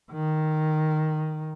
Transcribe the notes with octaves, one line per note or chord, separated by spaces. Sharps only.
D#3